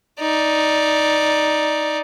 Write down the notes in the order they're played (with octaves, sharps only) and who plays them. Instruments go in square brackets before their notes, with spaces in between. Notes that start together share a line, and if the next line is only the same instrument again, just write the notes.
[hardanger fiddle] D#4 D5